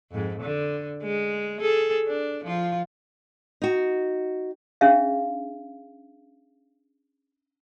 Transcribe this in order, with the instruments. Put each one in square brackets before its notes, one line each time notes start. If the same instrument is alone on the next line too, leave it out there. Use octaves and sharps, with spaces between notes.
[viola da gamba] F2 G#2
D3
G#3
G#4 A4
D4
F3 F4
[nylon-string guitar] D#4 F#4
[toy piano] C#4 D4 G#4 E5 F5